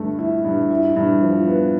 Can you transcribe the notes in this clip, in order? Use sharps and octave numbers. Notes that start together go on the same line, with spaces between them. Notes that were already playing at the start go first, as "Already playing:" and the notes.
Already playing: G2 D3 A3
E4
G2
E4
G2
F3
B3